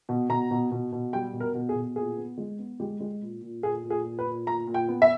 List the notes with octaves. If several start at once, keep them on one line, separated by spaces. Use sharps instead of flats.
B2
B2 A#5
B2
B2
B2
G3 G5
B2
A#4
B2
G#4
B2
A#2 G#4
B3
G#3
B3
G#3 G4
G#3
A#2
A#2
A#2 G#4
A#2
G#4
A#2
B4
A#2
A#2 A#5
A#2
G5
B3
E5